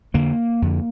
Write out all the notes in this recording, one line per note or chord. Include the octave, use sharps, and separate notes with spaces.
F2 D3 A#3
F2 D3